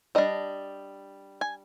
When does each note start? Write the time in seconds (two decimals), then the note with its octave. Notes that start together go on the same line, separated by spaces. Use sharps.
0.15 G3 D4 D#5
1.41 G#5